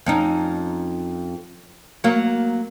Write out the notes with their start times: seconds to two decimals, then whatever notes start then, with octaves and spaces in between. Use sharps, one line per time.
0.06 F2 C#4 D#4
2.04 F#3 A#3